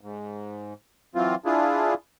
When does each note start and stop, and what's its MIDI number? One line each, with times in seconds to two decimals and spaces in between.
0.01 0.74 44
1.15 1.35 52
1.15 1.35 54
1.15 1.35 60
1.15 1.35 65
1.45 1.94 62
1.45 1.94 64
1.45 1.94 65
1.45 1.94 68